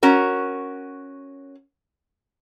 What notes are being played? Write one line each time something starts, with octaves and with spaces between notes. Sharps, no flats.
C#4 F#4 A#4